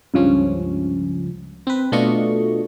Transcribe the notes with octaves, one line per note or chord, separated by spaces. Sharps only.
C#2 G2 F3 C#4
C4 B4
B2 A3 D4 F4 D#5 C#6